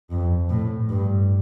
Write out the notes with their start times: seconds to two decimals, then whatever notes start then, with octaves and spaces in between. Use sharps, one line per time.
0.10 F2
0.50 A2
0.90 G2